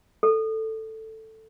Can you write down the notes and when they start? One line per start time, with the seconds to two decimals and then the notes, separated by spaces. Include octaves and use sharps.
0.23 A4